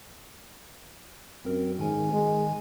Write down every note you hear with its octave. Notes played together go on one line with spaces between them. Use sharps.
F#2 C4 A#4
G#2 D#3 G#5
G#3